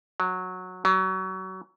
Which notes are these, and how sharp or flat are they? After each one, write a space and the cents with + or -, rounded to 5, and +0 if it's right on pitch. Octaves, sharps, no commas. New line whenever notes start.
F#3 -15
F#3 +25